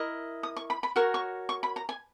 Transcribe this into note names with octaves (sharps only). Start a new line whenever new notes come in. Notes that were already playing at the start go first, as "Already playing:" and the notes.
Already playing: E4 A#4 D#5
D#6
C#6
B5
B5
F#4 A#4 C#5 C#6
C#6
C#6
B5
A#5
G#5